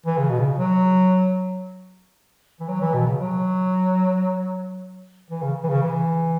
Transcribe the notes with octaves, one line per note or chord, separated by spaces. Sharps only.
E3
C#3
B2
C#3
F#3
E3
F#3
E3
B2
C#3
F#3
E3
C#3
E3
C#3
E3